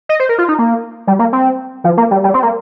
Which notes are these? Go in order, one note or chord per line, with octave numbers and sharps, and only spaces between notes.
D#5
C5
A#4
F4
D#4
A#3
G3
A#3
C4
F3
A#3
G3
G3
C4
A#3